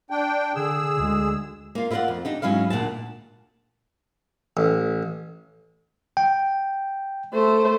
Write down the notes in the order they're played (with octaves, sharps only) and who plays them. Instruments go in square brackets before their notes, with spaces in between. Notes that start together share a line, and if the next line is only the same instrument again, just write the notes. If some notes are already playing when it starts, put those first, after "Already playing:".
[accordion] D4 G5
[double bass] D3 [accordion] G#4 E6
[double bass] D2 G#3
[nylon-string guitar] A#3 F4
E4 F4 A#4 C5 D5 F#5
F2
D4 D#4 G4
G#2 F#3 C#4 E4 F5
D2 A#2 F#5 A5
[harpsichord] A1
[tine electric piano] G5
[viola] A3 C5